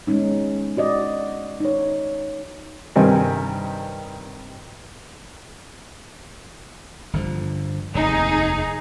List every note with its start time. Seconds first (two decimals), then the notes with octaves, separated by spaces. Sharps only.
0.07 G#3 B3 C#4 D#4
0.77 F#4 D5 D#5
1.60 D#4 C#5
2.96 G2 C3 D#3 C4 A#4 G#5
7.13 G1 D3 F3
7.95 F1 D#2 D#4 G#4